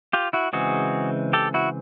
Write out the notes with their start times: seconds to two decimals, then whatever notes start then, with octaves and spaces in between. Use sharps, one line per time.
0.13 F4 G4
0.33 E4 F#4
0.53 C#3 E3 G#3 C4 F#4 G#4
1.33 G4 A4
1.54 E4 F#4